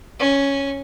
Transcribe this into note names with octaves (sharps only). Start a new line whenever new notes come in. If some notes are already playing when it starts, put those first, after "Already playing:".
C#4